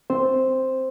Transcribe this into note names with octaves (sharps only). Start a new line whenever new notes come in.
C4 C5